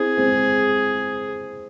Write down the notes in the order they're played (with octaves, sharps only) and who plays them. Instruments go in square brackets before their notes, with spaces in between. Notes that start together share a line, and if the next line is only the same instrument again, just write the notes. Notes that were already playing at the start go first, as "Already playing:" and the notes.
Already playing: [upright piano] C4 E4 [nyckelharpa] G#4
[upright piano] G#3 C4